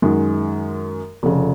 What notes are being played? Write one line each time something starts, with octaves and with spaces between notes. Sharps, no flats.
F#2 D#3 G#3
F1 F2 C#3